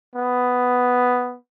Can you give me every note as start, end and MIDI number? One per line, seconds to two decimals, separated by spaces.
0.16 1.37 59